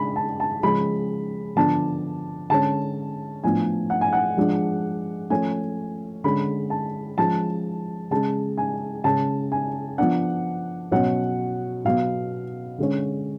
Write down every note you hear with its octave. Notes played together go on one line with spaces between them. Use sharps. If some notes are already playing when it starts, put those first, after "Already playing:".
Already playing: C#3 G#3 D4 B5
A5
A5
C#3 F3 G#3 C#4 B5
D3 F3 B3 D4 A5
D3 G#3 C#4 A5
A2 F3 B3 D4 G#5
F#5
G#5
F#5
F3 G#3 D4
F3 A3 C#4 G#5
D3 G#3 C#4 B5
A5
F3 G#3 C#4 A5
C#3 G#3 C#4 A5
G#5
C#3 G#3 C#4 A5
G#5
F3 B3 D4 F#5
B2 F#3 C#4 F#5
B2 F#3 B3 F5
D3 G#3 C#4